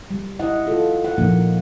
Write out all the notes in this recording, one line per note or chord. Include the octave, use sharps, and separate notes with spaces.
G3
E4 D#5 F#5
F4 A4
F#5
A#2 F3 A#3 D#4